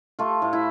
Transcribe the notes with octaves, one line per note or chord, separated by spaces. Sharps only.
A3 F4
A2
E4